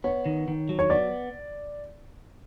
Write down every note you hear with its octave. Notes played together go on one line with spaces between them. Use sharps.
B3 C#5
D#3
D#3
F#3
C#5
B3 D5